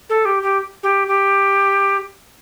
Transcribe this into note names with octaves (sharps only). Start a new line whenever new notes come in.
A4
G4
G4
G4
G4